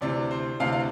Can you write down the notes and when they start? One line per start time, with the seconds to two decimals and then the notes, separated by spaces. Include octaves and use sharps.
0.01 D2 C3 E3 D5
0.31 C5
0.60 D2 C3 E3 F5
0.73 F5